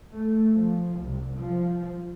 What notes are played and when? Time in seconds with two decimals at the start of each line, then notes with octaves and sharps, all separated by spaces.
0.13 A3
0.52 F3
0.97 C2
1.39 F3